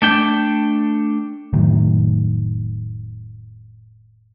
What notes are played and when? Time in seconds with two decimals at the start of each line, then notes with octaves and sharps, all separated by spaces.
0.02 A3 D4 G5
1.53 F1 A2 D#3 F#3